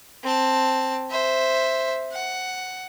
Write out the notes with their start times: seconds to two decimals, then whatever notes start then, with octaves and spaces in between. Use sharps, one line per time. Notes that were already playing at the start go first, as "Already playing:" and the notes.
0.23 C4 A5
1.10 C5 E5
2.12 F#5